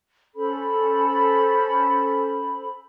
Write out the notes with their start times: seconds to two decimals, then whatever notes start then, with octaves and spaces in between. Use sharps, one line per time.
0.35 C#4 A4 C5 B5